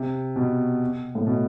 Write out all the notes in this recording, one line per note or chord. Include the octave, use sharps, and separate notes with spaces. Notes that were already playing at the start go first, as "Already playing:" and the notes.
Already playing: C3
B2
A2
B2